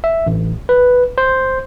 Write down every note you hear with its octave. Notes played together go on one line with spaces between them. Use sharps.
E5
A1
B4
C5